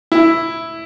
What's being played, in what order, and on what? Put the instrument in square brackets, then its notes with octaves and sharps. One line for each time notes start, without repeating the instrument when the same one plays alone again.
[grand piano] E4